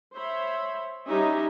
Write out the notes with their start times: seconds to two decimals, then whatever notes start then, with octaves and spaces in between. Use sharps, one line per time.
0.14 C5 C#5 E5 B5
1.07 G3 C#4 D#4 G4 D#5 E5